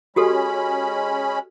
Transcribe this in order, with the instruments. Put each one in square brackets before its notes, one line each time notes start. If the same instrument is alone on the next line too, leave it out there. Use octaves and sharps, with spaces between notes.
[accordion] G#3 C#4 B5 [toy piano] F#4 G4 A4